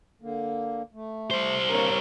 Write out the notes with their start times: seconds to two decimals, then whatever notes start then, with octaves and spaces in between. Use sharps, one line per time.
0.22 D3 A#3
0.93 A3
1.31 G3 C5
1.69 A#3 C4 D4 A#4 C#5